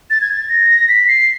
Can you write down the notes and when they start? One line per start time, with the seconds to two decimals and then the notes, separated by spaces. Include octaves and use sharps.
0.10 A6
0.21 G#6
0.32 A6
0.49 A#6
0.89 B6
1.08 C7